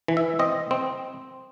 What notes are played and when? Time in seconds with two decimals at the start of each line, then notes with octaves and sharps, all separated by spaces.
0.08 E3
0.17 E5
0.39 C4 D#5
0.71 C4